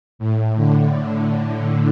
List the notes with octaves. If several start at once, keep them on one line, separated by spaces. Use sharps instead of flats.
A2
D3